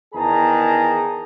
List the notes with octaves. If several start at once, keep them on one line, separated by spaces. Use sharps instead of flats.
E2 D#3 G#4 A5 A#5